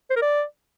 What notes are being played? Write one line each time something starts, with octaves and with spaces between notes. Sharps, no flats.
C5
A#4
D5